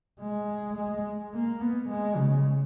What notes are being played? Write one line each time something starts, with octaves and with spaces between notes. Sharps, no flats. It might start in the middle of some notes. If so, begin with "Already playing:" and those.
G#3
G#3
A#3
B3
G#3
C#3